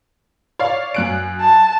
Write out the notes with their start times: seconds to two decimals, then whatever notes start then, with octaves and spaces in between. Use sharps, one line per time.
0.59 C#5 D5 F5
0.94 F#2 F#6 D7
1.41 A5